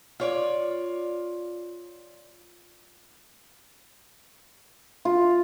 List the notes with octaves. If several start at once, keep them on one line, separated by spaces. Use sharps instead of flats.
F4 C#5 D5
F4